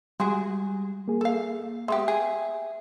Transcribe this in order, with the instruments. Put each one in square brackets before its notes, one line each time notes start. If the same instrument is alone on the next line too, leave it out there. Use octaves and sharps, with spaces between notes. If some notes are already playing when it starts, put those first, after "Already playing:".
[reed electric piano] G3 [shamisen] G#3 F#4 G#4
[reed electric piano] A#3 G#4
[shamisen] A4 F5
[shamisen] G#3 B3 G4 [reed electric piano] E5
[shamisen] G#4